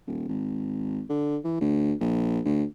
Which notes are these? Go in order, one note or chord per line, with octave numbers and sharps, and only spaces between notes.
D#1
G#1
D3
E3
D2
A#1
D2